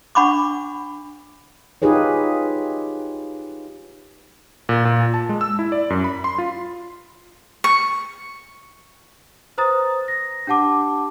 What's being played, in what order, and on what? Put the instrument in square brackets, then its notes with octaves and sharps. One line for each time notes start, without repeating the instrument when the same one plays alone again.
[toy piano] D4 F#5 B5 C#6 D6
[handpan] D#4 F4 G4 G#4 B4 C#5
[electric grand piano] A#2
A#2
A5
G#3
E6
E4
D5
F#2
B5
C6
F4
[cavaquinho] C#6
[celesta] B4 C5 A#5 D#6 A6
A#6
D4 G4 F#5 A5 D6